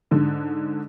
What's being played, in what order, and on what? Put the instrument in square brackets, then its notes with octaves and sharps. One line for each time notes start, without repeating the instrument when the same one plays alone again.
[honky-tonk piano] G#2 D3